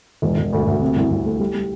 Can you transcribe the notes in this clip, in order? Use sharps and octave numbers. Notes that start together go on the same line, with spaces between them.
E1
E1
D2
D2
C3
C2
C2
A3
G3
G3